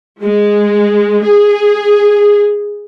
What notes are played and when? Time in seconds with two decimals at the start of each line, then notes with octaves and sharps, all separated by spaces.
0.23 G#3
1.24 G#4